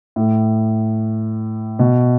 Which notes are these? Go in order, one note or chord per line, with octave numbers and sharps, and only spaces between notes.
A2
B2